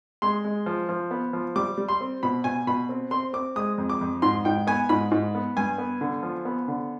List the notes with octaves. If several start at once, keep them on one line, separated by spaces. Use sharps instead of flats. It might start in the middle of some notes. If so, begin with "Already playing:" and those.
G#3 C6
G#3
F3
F3
B3
F3
G3 D6
G3
C6
C4
B2 B5
B2 G#5
B2 B5
C4
C4 C6
C4 D6
G#3 D#6
F2
D6
F2
G#2 C6
G#2 G5
B3 G#5
G#2 B5
G#2
B3
G2 G#5
B3
D3
F3
B3
D3